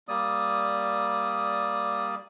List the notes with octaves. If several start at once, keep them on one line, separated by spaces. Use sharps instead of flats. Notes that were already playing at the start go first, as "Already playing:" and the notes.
G3 A#3 D5 D#6